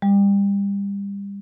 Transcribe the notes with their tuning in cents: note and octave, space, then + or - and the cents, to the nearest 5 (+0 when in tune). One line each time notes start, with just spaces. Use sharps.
G3 +30